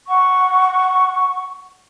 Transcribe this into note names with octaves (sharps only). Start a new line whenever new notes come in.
F#5 C#6